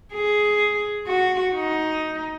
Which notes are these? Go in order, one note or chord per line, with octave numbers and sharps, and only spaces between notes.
G#4
F#4
D#4